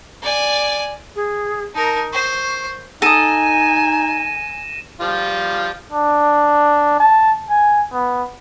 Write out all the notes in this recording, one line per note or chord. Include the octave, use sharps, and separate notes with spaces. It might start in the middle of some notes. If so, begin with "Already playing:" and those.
D5 G#5
G#4
D#4 A#4 A5
C5 C#6
D#4 A4 D#5 G#5 A#6 D#7 E7
F3 G3 F4
D4
A5
G#5
B3